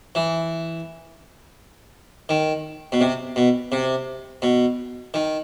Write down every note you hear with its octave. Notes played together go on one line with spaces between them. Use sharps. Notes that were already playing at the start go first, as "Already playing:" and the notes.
E3
D#3
B2
C3
B2
C3
B2
D#3